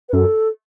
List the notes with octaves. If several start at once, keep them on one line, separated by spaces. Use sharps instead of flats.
B4
F#2 A4